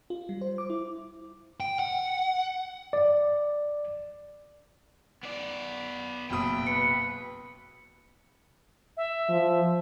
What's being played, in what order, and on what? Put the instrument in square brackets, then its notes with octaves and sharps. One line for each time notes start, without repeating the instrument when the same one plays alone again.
[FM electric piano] F4
G3
C5
D6
E4
[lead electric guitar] G5
F#5
[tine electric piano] D5
[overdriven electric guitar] B3 D5
[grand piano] F#1 B2 D#6 [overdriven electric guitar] G5 [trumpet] B5
[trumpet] B4 [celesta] C#7
[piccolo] E5
[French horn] F3